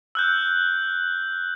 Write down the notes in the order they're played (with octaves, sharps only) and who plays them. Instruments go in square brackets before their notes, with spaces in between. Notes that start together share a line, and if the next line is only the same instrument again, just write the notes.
[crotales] E6 F#6 G6